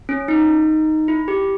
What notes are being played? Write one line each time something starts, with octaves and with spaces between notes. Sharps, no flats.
C#4
D#4
E4
G4